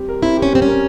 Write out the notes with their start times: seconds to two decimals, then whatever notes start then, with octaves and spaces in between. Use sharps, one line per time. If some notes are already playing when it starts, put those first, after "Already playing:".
Already playing: G3 C4 G4
0.09 A#4
0.22 C4 E4
0.37 G4
0.42 C#4
0.52 G3 C4
0.62 C#4
0.67 A#4